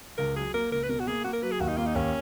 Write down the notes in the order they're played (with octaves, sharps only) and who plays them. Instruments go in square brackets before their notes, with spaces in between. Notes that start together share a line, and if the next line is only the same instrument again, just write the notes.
[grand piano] C#2 [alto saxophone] A#4
[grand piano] F#3 [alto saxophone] G#4
[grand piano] A#3 [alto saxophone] A#4
[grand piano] C#2 [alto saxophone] A#4
[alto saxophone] B4
[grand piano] B2 [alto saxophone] A#4
[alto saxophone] F#4
[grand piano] A#3 [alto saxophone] G#4
[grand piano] A#3 [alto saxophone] F#4
[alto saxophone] A#4
[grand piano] F#3 [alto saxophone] B4
[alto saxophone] G#4
[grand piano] D#2 [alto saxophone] F#4
[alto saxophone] D#4
[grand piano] A#3 [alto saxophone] F4
[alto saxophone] D#4
[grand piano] D#2 [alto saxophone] C#4